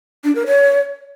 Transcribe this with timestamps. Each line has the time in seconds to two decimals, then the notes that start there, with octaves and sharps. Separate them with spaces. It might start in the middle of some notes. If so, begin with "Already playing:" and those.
0.24 D4
0.35 A#4
0.47 C#5